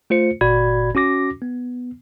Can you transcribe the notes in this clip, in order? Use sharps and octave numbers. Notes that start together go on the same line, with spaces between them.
A3 F4 C5 C#7
G1 A#2 F#4 D5 B5 G#6
C#4 F#4 D6 A#6
B3